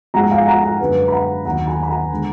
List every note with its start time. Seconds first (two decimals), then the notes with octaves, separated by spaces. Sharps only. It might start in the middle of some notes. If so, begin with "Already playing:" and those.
0.14 G#2 F3 G#3 F#5 A#5
0.31 F5 G#5
0.47 F#5 A#5
0.63 F#5 A#5
0.80 F#2 D3 G#3 B4
1.08 B5
1.12 F#5 A#5
1.45 D#2 D#3 F#3 F#5 A#5
1.67 G#5 B5
1.83 B5
1.89 F#5 A#5
2.12 D3 G#3